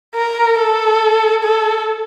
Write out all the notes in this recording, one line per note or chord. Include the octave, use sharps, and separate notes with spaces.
A#4
A4
A4